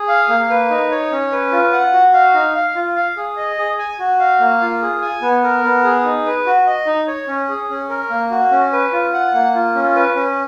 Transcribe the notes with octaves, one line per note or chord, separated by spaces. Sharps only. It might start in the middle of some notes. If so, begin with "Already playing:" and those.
Already playing: G#4
F5
A#3
B4
D#4
C#5
C#4
B4
F4
F#5
F#4
F5
D#4
F5
F4
F5
G#4
D#5
G#4
G#5
F#4
F5
A#3
F4
G#4
G#5
B3
A#4
B3
G#4
D#4
B4
F#4
D#5
D#4
C#5
C#4
G#4
C#4
A#4
A#3
F#4
C#4
B4
F4
F#5
A#3
F4
C#4
B4
C#4